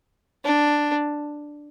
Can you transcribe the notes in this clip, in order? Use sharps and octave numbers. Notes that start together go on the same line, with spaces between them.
D4